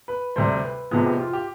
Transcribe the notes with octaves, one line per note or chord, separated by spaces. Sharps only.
B4
D2 C3 G3 C5
B4
F1 F2 C3 F3 B3 G#4
G4
F4
G4